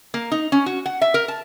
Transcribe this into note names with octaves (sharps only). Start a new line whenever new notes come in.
A#3
D#4
C#4
F#4
F#5
E5
A#4
A5